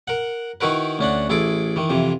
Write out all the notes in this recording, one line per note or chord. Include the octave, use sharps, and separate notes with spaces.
A#4 F#5
D#3 D#4 E4 F#4 A#4 B4
D2 C#4 D4 F#5
A1 E4 G#4 A4 D6
D#3 E3
F2 C3 E3